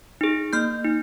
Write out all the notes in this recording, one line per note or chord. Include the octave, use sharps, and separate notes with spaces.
D#4 G#4
A#3 F6 G6
D#4